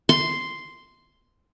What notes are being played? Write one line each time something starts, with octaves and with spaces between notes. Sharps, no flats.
C6